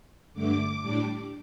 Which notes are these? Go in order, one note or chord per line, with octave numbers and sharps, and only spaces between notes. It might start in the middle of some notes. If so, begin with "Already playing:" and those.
G2 D3 A3 D6
A2 G3 D4